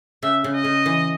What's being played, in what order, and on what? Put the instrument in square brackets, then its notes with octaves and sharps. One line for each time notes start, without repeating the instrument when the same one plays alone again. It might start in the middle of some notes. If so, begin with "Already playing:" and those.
[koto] C#3 [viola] E5
[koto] C#3
[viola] D#5
[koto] C#3
E3